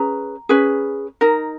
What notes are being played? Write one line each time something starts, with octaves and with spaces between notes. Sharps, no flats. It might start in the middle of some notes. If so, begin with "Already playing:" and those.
Already playing: C#4 G#4 B4 A#5
C#4 G#4 B4
D#4 A#4